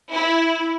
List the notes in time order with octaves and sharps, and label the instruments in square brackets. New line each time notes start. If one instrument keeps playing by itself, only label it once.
[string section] E4